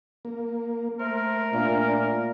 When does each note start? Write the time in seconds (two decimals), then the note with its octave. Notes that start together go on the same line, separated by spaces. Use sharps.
0.25 A#3
0.99 A3 A#4 C5
1.53 A#2 D4